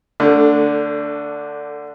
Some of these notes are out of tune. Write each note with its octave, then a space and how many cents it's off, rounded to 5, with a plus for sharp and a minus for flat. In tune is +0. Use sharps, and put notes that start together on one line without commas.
D3 +0 A3 +25 D4 -10